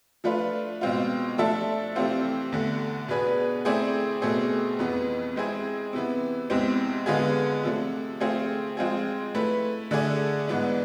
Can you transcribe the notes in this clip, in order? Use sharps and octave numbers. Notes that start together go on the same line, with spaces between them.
F3 A3 D4 F4 B4
B2 G#3 C4 F4
F3 A3 D4 A4 E5
C3 E3 A3 C4 F4
E2 D3 A3
B2 B3 D4 G#4 B4
A3 C4 E4 G#4 D5
B2 A3 C4 G#4
F2 E3 B3
G#3 C4 E4 G#4
C3 E3 B3 E4
E2 C3 E3 G#3 C4
D3 G#3 B3 F4 G#4
C3 F3 A3
A3 C4 F4 G#4
F3 G#3 C4 F4 G#4
A3 E4 B4
D3 A3 D4 G#4 D5
G#2 E3 B3 D4